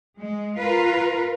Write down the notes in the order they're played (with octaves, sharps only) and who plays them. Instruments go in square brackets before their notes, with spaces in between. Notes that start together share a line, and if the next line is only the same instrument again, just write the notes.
[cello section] G#3
F4 A#4 B4